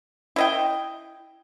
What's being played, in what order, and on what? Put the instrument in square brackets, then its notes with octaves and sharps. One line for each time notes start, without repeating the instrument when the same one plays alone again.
[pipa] E4 D#5 G5